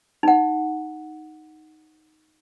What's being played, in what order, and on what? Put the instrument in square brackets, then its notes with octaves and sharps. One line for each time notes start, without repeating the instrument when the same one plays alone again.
[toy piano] D#4 F#5